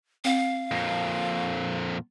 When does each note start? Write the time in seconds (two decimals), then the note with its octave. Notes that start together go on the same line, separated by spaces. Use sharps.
0.25 C4 F5
0.71 F2 A#2